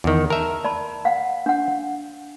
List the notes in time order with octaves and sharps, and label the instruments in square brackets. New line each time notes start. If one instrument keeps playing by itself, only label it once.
[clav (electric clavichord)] E2 D#3
[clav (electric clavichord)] A#4 E5 [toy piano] A5
[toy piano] D5 A5 B5
F5 F#5
D4 F#5